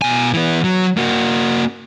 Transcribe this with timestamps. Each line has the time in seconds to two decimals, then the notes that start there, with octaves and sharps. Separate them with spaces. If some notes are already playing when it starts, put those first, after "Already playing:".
0.02 B2 G#5
0.34 E3 B3
0.64 F#3
0.97 A#3 F#4